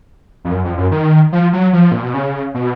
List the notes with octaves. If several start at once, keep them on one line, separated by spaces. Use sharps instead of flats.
F2
F#2
F2
F#2
D#3
F3
F#3
F3
A#2
B2
C#3
B2